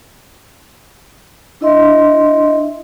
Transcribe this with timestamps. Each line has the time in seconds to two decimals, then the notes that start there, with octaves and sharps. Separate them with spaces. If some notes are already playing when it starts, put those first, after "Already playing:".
1.61 D4 E4 D#5 E5 C6